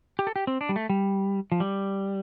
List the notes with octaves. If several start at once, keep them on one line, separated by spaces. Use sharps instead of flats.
G4
A4
G4
C4
D4
G3
A3
G3
F3
G3